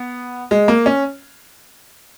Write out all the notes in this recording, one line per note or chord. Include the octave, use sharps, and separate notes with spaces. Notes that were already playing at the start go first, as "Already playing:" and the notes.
Already playing: B3
G#3
A#3
C#4